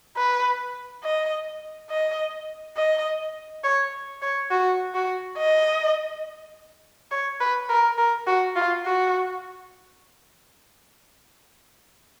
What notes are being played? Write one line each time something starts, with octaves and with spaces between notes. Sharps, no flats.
B4
D#5
D#5
D#5
C#5
C#5
F#4
F#4
D#5
C#5
B4
A#4
A#4
F#4
F4
F#4